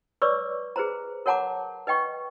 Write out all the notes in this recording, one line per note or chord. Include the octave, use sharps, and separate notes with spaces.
B4 C#5 D5 C#6 D6 E6
G#4 B4 C5 A#5
A#4 C#5 F#5 A5 A#5 D6
B4 D#5 G5 C#6